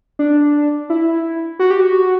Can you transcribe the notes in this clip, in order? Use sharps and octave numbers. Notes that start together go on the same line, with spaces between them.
D4
E4
F#4
G4
F#4